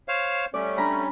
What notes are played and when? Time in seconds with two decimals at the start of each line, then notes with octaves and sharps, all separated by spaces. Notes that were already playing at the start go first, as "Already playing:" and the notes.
0.08 C5 C#5 F5
0.54 G3 A3 C#4 D5
0.77 D4 A#5 B5